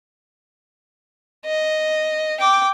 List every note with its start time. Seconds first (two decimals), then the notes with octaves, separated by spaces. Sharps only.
1.46 D#5
2.40 G5 D6